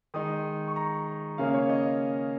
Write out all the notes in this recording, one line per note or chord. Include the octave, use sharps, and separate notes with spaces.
D#3 G#3 D#4 D#6
C#6
A#5
C#3 A#3 C#4 F5
C#5
D#5